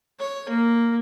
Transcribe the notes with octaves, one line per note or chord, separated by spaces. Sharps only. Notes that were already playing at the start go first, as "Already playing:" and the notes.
C#5
A#3